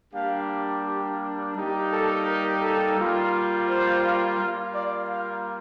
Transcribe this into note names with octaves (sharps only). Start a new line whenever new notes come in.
G3 A#3 D4 G4 F5
G4
G3 A#3 D#4 G4
A4
A#4
A4
G3 A#3 F4
C5
G3 A#3 F4
D5
F5